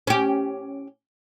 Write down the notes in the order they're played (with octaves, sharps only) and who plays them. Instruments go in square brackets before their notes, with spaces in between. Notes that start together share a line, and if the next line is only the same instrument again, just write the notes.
[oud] C#4 G4